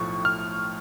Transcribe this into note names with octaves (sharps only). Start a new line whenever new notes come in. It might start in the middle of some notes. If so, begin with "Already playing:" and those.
Already playing: B1 A2 F3 C#6
F6